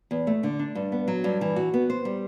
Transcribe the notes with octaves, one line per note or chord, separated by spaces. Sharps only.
E2
A3
D3
D4
G2
B3
F#3
G2
E3
F#4
B3
C5
G3